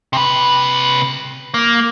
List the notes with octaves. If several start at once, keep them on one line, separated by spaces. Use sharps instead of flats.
C3 B4
A#3